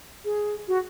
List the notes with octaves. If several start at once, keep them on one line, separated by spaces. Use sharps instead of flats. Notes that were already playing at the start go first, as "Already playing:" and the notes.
G#4
F#4